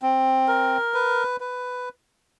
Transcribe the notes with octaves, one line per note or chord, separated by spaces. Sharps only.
C4
A#4
B4
B4